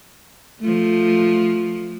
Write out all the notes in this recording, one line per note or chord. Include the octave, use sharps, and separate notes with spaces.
F3 A3